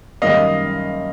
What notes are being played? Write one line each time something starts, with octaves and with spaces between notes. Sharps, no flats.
F#2 D#3 G3 A#3 D#5 F5